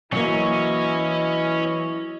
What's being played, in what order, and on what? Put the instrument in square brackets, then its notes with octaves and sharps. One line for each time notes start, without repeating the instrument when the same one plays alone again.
[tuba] E3 [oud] F#3 A#3 [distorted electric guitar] C#4 [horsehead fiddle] E4 D#5